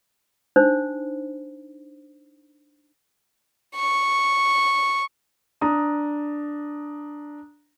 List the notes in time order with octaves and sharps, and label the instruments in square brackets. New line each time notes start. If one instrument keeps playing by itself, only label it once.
[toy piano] D4 D#4 C5
[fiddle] C#6
[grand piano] D4 A#5 D#6